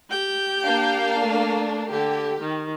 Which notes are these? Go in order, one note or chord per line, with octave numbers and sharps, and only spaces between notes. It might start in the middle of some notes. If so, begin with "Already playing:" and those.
G4 G5
A#3 D4 F5
A3
D3 G4
D#3